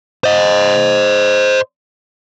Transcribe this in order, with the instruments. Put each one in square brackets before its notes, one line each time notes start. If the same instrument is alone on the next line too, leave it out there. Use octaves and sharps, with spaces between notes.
[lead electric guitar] C5 D#5